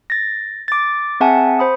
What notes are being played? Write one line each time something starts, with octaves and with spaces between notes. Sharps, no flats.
A6 A#6
D6 A6
C4 G#4 E5 F#5 G#5 A5
C5 B5 D#6